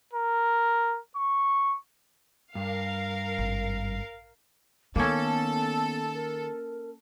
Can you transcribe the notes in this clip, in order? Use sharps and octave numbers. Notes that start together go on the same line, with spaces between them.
A#4
C#6
G2 A#4 F5
G#1
D#3 A#3 B3 C#4 A4
A#4